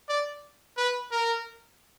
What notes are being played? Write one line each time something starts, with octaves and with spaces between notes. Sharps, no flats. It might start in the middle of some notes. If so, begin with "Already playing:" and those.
D5
B4
A#4